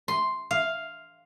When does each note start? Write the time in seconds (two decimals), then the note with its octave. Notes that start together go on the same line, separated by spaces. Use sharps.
0.08 C6
0.51 F5